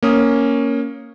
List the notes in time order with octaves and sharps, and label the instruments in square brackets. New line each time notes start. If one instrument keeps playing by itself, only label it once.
[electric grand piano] A#3 C#4 D#6